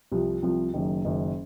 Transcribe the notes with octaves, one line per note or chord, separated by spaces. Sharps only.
C2 C3 F3
C2 C3 F3
F#1 F#2 D#3
F#1 F#2 D#3